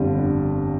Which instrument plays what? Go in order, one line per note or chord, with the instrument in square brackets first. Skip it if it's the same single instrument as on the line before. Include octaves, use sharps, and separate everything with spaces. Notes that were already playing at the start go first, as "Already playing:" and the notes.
Already playing: [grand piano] G1 F2 D3 G3